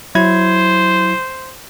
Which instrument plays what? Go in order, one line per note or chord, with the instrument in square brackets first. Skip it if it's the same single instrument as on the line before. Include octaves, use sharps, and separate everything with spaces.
[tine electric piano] F#3 E4 G#6 [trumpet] C5